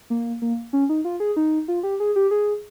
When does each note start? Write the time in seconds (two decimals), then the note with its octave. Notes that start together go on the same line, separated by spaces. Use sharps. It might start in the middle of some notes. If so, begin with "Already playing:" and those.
0.10 A#3
0.42 A#3
0.73 C#4
0.89 D#4
1.05 F4
1.20 G#4
1.37 D#4
1.68 F4
1.83 G4
2.00 G#4
2.16 G4
2.31 G#4